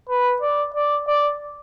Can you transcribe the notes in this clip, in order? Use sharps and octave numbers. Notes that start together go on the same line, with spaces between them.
B4
D5
D5
D5